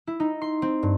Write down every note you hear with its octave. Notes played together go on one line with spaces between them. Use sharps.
E4
D#4
C6
C4
G2